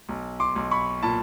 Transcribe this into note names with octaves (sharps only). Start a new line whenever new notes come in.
B1
C6 D6
B1
B5 C#6
A#2 A5 B5